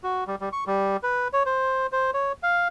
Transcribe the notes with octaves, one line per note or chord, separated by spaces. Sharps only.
F#4
G3
G3
C#6
G3
B4
C#5
C5
C5
C#5
F5